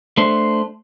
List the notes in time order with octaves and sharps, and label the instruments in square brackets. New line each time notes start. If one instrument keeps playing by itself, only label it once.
[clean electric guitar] A3 D4 C5